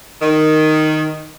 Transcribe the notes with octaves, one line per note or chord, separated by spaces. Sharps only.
D#3